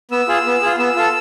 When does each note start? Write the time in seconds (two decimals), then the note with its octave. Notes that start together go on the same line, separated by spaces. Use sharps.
0.11 B3 E6
0.28 F4 G#4
0.46 B3
0.62 F4 G#4
0.79 B3 E6
0.96 F4 A4